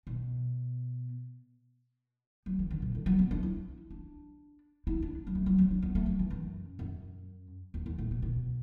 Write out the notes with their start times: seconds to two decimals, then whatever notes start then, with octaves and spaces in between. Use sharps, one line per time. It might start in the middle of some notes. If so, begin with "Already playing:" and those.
0.07 B2
2.46 F#3
2.59 E3
2.71 D3
2.82 B2
2.95 D3
3.06 F#3
3.19 B3
3.31 D4
3.43 E4
3.90 D4
4.87 E4
5.02 D4
5.27 F#3
5.35 A3
5.46 F#3
5.58 F#3
5.71 D4
5.82 B3
5.95 A3
6.06 F#3
6.19 E3
6.30 F#2
6.79 F#2
7.74 E2
7.86 E2
7.98 A2
8.11 B2
8.22 B2